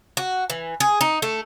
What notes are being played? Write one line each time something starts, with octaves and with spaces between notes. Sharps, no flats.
F#4
E3
G#4
D#4
A3